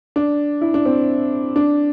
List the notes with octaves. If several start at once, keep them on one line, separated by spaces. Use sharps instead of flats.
D4
E4
D4
C4
D4